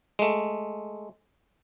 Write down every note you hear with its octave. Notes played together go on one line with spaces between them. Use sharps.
G#3 A3